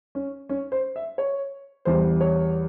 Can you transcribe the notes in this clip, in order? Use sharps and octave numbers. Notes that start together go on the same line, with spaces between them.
C#4
C#4
C5
E5
C#5
E2 E3 G3 C5
C#5